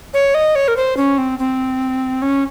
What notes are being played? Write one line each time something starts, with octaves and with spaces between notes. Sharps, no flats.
C#5
D#5
C#5
A#4
C5
C#4
C4
C4
C#4